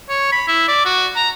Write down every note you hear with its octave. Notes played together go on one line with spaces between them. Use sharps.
C#5
B5
E4
D5
F#4
A#5